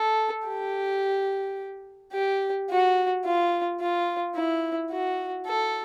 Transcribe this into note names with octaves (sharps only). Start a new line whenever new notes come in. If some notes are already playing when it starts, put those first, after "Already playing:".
Already playing: A4
G4
G4
F#4
F4
F4
E4
F#4
A4